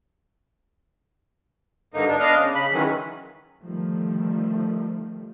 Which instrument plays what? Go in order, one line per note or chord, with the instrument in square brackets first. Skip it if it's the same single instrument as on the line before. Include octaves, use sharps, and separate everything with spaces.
[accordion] G2 D3 A#3 D#4
D4
B3 D4 D#5 F5
C#3
C#3 B5
D#3 E3 F#3 G#3 C#4
[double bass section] D3 D#3 F3 G3 A3